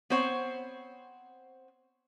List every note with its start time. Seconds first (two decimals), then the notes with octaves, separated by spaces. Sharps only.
0.10 B3 C4 C5 C#5 F#5